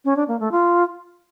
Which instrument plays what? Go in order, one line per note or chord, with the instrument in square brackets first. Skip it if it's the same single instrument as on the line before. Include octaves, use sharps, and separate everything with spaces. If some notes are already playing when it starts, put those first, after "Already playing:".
[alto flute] C#4
D4
A#3
A3
F4